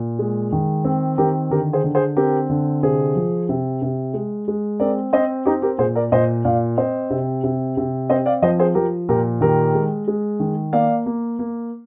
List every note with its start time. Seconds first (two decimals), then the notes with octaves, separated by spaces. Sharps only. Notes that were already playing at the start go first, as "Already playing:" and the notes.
Already playing: A#2
0.19 G#3
0.52 D#3
0.85 C4
1.18 D#3 G4 A#4
1.50 D3 G4 A#4
1.73 G#4 C5
1.84 D3
1.95 G#4 C5
2.17 C4 G4 A#4
2.49 D3
2.83 C3 G#4 C5
3.16 F3
3.49 C3
3.82 C3
4.14 G#3
4.48 G#3
4.80 C4 A#4 D5
5.13 C4 C5 D#5
5.46 C4 D#4 G4
5.62 G4 A#4
5.78 A#2 G#4 C5
5.95 A#4 D5
6.12 A#2 C5 D#5
6.45 A#2 D5 F5
6.77 C4 C5 D#5
7.10 C3
7.44 C3
7.77 C3
8.10 C4 C5 D#5
8.26 D5 F5
8.42 F3 C5 D#5
8.59 G#4 C5
8.75 F3 G4 A#4
9.09 A#2 G4 A#4
9.41 D#3 G4 A#4
9.74 G#3
10.08 G#3
10.40 D#3
10.73 A#3 D5 F5
11.06 A#3
11.39 A#3